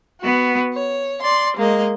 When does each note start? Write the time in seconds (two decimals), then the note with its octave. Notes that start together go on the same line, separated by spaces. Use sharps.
0.21 B3 F#4
0.74 C#5
1.21 D5 C6
1.56 G#3 A#3 D#5